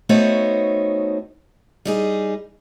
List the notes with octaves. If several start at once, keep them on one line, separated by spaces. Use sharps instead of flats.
A3 B3 D#4 F#4 C5 C#5
G3 D#4 G#4